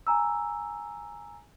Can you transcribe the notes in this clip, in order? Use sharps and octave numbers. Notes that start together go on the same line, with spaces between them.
G#5 A#5 E6